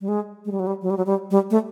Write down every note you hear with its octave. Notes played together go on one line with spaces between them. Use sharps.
G3
G#3
G#3
G3
F#3
G3
F#3
G3
F#3
G3
G3
A3